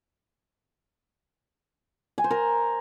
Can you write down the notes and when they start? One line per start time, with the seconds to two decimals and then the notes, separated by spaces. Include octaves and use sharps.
2.18 G#5
2.24 C5
2.31 A#4